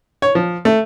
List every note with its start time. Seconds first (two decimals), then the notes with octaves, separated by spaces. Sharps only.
0.22 C#5
0.35 F3
0.65 A3